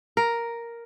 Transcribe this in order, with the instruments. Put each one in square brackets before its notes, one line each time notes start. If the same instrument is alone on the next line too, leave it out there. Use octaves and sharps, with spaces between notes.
[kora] A#4